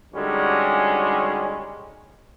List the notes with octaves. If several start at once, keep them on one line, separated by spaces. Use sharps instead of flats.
D3 G3 G#3 C#4 D#4 F#4